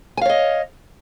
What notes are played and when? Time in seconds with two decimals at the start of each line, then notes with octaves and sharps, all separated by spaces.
0.17 G#5
0.21 F5
0.25 C#5
0.29 D#5